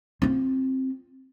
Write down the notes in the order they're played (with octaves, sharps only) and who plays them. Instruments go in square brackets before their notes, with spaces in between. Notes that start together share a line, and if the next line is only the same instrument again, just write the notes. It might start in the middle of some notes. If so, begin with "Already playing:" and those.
[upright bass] C4 F4